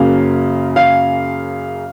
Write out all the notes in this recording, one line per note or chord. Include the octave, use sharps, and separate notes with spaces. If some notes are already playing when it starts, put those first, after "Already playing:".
Already playing: F#2 C#3 F#3 A#3 F5
F5